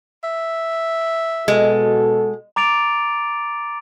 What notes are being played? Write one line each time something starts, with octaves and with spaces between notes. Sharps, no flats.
E5
B2 G#3 F#4 A4
A#5 D6 A6 D7 F7